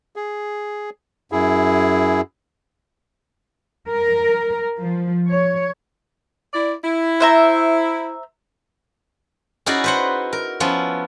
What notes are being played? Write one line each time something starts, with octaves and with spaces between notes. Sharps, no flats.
G#4
F#2 E4 G#4
A#4
F3
C#5
E4 D5
E4
C5 E5 A#5
C#4 D#4 E4 F#4 G#4 D5
B4 C5 F#5
A#4
F3 B3 C#4 E4